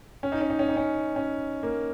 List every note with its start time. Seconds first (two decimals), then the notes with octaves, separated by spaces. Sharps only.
0.23 C#4
0.32 D#4
0.41 C#4
0.50 D#4
0.59 C#4
0.69 D#4
0.77 C#4
1.16 C#4
1.63 A#3